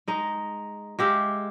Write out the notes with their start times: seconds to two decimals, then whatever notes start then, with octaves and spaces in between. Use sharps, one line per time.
0.08 G#3 D#4
0.99 G#3 G4 E5 F5